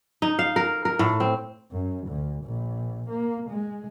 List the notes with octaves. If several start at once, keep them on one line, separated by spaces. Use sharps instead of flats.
D#4
F5
A#4
A#4
A2
C4
F#2
D2
A#1
A#3
G#3